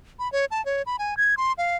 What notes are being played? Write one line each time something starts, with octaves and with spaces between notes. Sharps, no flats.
B5
C#5
A5
C#5
B5
G#5
G#6
C6
F5